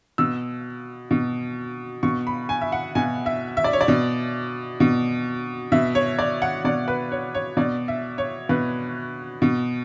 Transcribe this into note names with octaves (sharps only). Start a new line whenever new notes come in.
B2 E6
B2
B2 C#6
B5
G#5
E5
F#5
B2 G#5
E5
E5
D5
C#5
D5
B2
B2
B2 E5
C#5
D5
F#5
B2 D5
B4
C#5
C#5
B2 D5
E5
C#5
B2 B4
B2